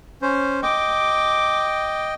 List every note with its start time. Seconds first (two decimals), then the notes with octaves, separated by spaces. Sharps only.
0.22 C#4 C5
0.63 D#5 G5 D6